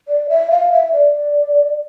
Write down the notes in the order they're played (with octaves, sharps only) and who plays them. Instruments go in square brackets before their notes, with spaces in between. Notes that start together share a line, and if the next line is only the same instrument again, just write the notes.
[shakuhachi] D5
E5
F5
E5
D5